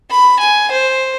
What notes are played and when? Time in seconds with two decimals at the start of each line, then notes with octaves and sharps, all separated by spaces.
0.11 B5
0.40 G#5
0.71 C5